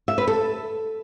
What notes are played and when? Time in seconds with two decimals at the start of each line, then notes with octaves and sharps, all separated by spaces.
0.08 E5
0.18 B4
0.28 A4